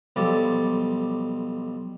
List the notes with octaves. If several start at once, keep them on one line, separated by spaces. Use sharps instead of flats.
B1 F3 G3 A4 D5